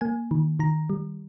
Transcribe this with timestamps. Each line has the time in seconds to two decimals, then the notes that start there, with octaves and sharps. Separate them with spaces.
0.01 A#3 G#5
0.31 D#3
0.59 D#3 A#5
0.90 G3